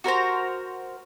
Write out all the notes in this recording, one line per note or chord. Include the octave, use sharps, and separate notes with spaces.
F#4 A#4 C5 A#5